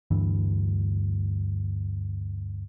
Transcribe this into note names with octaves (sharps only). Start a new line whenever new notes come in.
D2 G2 E3